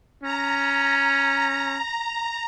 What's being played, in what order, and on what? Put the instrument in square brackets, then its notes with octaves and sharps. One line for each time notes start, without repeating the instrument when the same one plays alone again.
[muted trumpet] C#4 [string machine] A#5